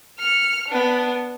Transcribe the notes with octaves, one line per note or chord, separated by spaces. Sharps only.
F6 C#7
B3 D4